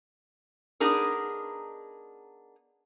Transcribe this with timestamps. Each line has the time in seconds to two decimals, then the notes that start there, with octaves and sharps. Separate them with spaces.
0.80 B3 D4 D#4 G#4 A#4